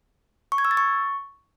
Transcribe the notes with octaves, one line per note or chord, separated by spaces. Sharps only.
C#6
G#6
E6
A6
C#6